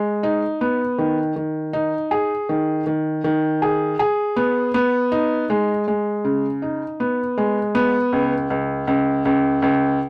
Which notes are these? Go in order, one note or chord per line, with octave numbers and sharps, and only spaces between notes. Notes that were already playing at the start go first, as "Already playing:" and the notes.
Already playing: G#3
D#4
B3
D#3
D#3
D#4
G#4
D#3
D#3
D#3
G#4
G#4
B3
B3
D#4
G#3
G#3
C#3
D#4
B3
G#3
B3
C#2
C#2
C#2
C#2
C#2